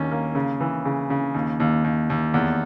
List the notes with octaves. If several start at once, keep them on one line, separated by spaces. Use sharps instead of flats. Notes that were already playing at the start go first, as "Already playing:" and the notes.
Already playing: D#2 A#3 C#4
A#3
C#3
E3
C#3
C#3
D#2
D#2
D#2
D#2
E2